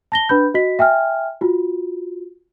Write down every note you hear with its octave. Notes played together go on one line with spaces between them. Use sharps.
A5 A#6 G7
D4 B4 B5 G6
F#4 D#5 B6
E5 G5 G#5 F6
F4 F#4